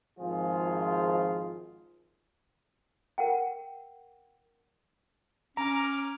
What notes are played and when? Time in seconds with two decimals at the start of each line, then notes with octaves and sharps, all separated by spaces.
0.18 G#1 F3 F4 G#4
3.18 A#4 F#5 G5
5.57 C#4 A#5 D6 F6